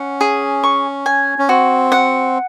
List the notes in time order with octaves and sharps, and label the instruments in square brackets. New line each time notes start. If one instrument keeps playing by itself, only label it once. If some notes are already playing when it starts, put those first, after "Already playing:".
Already playing: [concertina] C#4 [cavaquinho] F#5
[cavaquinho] G#4
C#6
G#5
[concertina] C#4
[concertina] C4 [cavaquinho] F#4
[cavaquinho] F#5